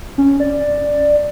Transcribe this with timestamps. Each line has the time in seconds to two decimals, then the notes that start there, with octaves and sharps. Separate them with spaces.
0.18 C#4
0.40 D5